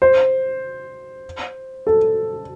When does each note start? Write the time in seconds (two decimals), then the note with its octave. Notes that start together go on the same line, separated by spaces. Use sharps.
0.02 C5
1.87 A4